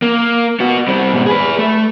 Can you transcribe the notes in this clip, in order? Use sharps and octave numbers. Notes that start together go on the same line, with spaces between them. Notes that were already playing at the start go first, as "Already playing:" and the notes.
A#3
B3 F#4
G3 C4
G#2 B2
G#4 B4
A3